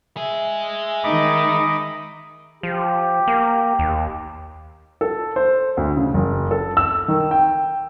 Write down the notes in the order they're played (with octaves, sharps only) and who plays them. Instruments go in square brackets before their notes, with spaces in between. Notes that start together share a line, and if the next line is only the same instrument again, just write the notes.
[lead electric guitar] G#3 G#4 [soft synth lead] E5
[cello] D#3 D#4 [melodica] D#5 B5 D6
[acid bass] F3 [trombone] G4
[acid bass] A#3
D#2
[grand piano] A4
C5
D2
C#3
F#1
A4
E6
D#3
G5